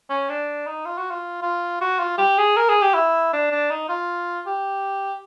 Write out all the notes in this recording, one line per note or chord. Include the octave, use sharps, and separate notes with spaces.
C#4
D4
D#4
F4
F#4
F4
F4
F#4
F4
G4
G#4
A#4
G#4
G4
E4
D4
D4
D#4
F4
G4